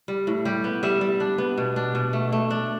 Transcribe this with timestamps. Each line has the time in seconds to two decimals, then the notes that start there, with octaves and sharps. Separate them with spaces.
0.08 G3
0.27 A2
0.45 G3 G4
0.64 B3
0.83 G3 E5
1.01 G3
1.20 D4
1.38 B3
1.58 B2
1.76 D4
1.95 B2
2.13 A3
2.32 A3
2.50 D4